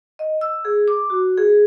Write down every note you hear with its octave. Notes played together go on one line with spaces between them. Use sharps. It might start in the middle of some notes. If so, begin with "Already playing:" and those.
D#5
E6
G#4
D6
F#4
G#4